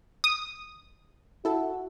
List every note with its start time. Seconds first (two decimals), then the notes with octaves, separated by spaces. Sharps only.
0.24 D#6
1.45 E4 F#4 A4